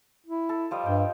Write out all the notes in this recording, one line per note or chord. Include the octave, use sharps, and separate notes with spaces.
E4
A4
F3 G3 D#5
G2 G5